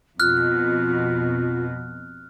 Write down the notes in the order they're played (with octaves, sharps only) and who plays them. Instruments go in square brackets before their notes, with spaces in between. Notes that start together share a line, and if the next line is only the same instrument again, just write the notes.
[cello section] F2 B2 [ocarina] F4 [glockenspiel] F6 F#6